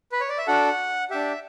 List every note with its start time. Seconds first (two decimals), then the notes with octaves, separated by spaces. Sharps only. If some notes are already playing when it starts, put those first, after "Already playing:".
0.12 B4
0.21 C#5
0.29 D5
0.38 E5
0.47 D4 F#4 A4 F#5
1.10 D4 G4 E5